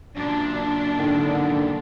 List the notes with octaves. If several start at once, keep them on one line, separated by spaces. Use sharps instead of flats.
F#2 A#2 D4
G#1 D3 D#3